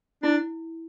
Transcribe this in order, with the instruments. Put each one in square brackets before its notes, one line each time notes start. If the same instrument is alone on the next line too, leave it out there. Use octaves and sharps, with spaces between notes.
[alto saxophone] D4 [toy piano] E4